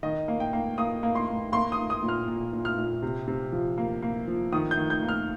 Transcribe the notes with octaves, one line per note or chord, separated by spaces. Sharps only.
D#3 D#5
A#3
G5
A#3
A#3 D#6
A#3
C6
A#3
A#3 C6
D#6
A#3
D#6
A#2
F6
A#2
A#2
F6
A#2
C3
C3
F3
A#3
A#3
F3
D#3 D#6
G6
D#3
G6
A#3
F6